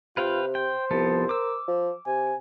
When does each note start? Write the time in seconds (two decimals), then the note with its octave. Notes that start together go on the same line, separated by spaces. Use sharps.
0.17 C3 F4 B4 F5 G5
0.55 C5 G5
0.91 C2 F3 B3 A4
1.29 A#4 D6 E6
1.68 F3
2.06 C3 G#5